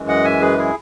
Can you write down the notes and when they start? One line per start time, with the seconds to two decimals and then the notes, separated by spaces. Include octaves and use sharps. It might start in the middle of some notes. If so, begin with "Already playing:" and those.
Already playing: F#2 E3 G#3
0.08 D#5 F#5
0.25 E5 G#5
0.41 G#4 B4
0.58 E4 G#4